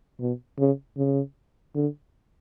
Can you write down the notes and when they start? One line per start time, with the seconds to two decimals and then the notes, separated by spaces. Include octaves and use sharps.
0.20 B2
0.58 C#3
0.97 C#3
1.75 D3